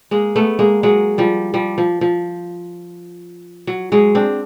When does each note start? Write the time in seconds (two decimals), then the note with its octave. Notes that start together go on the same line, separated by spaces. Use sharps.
0.11 G#3 A#3
0.36 A3 B3
0.59 G#3 A#3
0.83 F#3 G#3
1.18 F3 G3
1.54 F3 G3
1.78 F3
2.01 F3
3.67 F#3
3.92 F#3 G#3
4.15 C4 D4